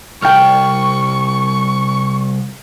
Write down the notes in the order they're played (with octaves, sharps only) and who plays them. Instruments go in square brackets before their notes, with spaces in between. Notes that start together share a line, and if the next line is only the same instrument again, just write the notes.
[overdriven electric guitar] C2 [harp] G5 F6 [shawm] C#6